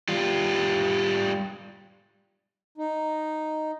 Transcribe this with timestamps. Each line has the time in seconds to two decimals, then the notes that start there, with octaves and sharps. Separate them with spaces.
0.09 G3 F4
2.78 D#4